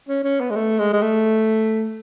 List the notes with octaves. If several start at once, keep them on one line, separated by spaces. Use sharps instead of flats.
C#4
C#4
B3
G#3
A3
G#3
G#3
A3